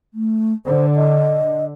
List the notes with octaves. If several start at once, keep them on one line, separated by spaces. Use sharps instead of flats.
A3
D3 C5
D#5